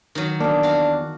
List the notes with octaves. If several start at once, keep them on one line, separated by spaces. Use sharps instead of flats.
D#3 F#3
E2 A#3 D4
F#4 F5